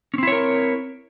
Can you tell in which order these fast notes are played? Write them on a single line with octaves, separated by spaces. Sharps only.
C#4 C4 E4 C#5 A#4